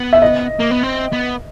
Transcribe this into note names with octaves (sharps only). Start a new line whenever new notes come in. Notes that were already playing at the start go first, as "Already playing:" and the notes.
Already playing: B3
E5
D#5
A#3
B3
C4
B3